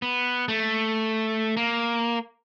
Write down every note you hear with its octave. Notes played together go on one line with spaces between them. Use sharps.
B3
A3
A#3